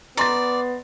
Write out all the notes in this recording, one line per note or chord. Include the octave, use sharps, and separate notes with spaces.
B3 D5 A#5 C6 A6